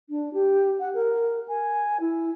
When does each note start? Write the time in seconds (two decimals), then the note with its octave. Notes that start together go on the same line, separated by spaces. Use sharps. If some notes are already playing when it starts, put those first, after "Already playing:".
0.09 D4
0.33 G4
0.79 F#5
0.94 A#4
1.48 G#5
2.00 E4